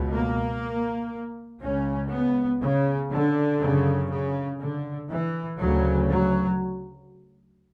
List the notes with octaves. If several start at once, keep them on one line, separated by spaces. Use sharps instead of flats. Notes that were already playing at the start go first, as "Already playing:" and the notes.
Already playing: C#2 B2
A#3
C#2 C#3 C#4
B3
C#3
D3
F#2 C#3
C#3
D3
E3
D2 C#3 F#3
F#3